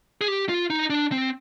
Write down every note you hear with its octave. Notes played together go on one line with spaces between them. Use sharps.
G#4
G4
F4
D#4
D4
C4